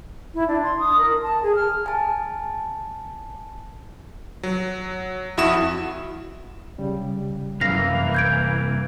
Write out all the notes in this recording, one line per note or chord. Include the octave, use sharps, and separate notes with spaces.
E4
D4
C6
D#6
A#4
A5
G#4
F6
G#5 A5
F#3
F2 E4 F#4 D#6 E7
C#3 G3
C2 F#2 E3 A#3 F5 A#6
G6 G#6 D7